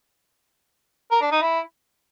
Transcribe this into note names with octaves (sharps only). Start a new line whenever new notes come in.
A#4
D4
D#4
E4